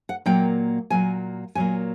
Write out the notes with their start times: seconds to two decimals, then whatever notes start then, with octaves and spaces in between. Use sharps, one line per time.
0.09 F#5
0.26 A#2 F#3 A#3 G5
0.90 A#2 F#3 A#3 G#5
1.55 A#2 F#3 A#3 G#5